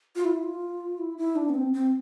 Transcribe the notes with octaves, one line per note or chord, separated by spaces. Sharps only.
F4
E4
F4
E4
E4
D4
B3
C4
C4